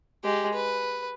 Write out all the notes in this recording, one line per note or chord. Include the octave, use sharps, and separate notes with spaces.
G#3 G4
B4